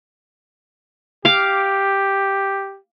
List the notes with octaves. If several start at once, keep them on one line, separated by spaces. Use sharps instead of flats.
G4 F5 D6